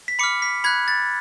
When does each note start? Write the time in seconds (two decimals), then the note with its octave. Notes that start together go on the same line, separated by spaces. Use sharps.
0.08 B6
0.19 B5 D6 F6 C#7
0.42 B6
0.64 B5 F#6 G#6
0.88 A6